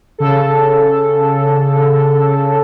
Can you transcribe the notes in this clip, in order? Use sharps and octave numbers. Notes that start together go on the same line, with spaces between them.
C#3 A4